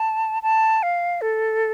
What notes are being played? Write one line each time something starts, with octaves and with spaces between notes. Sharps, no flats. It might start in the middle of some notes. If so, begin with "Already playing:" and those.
Already playing: A5
A5
F5
A4